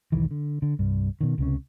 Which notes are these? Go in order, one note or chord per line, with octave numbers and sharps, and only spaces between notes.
E1 B1 D#3 E3
D3
D3
C2 G2
B2 D#3
C#2 C3 C#4